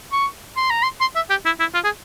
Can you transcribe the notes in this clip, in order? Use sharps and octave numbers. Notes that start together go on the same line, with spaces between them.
C#6
C6
A#5
C6
C6
E5
G4
E4
E4
F4
G#4